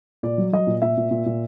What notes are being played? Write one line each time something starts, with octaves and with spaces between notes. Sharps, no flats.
A#2 D5
F#3
F#3 D#5
A#2
A#2 E5
A#2
A#2
A#2